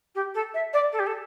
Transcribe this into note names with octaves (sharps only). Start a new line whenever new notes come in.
G4
A4
E5
D5
A4
G4
A4